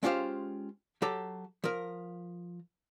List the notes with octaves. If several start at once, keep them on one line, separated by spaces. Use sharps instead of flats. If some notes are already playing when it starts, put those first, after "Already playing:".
G#3 C#4 F4 G4 C5 F5
F#3 G4 A4 A#5
F3 A#4